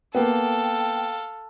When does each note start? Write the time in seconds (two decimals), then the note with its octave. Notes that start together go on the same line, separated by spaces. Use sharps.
0.15 A#3 B3 A4 F5 G5